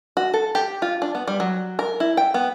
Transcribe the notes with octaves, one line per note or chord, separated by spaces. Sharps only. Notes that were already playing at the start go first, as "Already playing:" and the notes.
F#4
A4
G4
F4
D4
B3
G3
F#3
A#4
E4
G5
B3